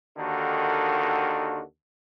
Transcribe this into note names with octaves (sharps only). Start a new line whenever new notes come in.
D#2 D3 D#3 F#4 A4